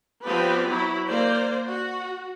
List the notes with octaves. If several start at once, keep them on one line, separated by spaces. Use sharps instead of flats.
F3 B3 C4 G4 B4 D5
F#3 E4
A#3 C5 D5
F#4